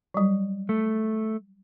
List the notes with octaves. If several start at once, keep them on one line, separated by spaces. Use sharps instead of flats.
F#3 G3
A3